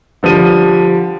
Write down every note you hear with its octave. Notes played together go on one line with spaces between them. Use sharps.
D3 F3 G3 D#7